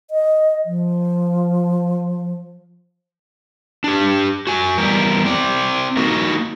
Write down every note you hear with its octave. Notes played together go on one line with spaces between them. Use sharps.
D#5
F3
D4 G4
F#4 G#5
E2 G3 G4 A#4
C4 D5
A#3 D#4 F#4